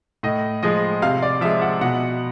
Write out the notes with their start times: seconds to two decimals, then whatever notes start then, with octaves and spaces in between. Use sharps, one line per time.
0.23 A2 D#5
0.63 F3 G#3 D#5
1.02 C3 F5
1.22 D5
1.41 F3 E5
1.45 G#3
1.62 F#5
1.81 B2 F#5